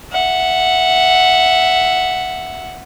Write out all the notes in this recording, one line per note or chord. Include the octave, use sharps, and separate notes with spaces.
E5 F#5